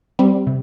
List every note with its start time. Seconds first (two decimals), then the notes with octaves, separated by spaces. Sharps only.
0.19 G3 C4
0.47 C3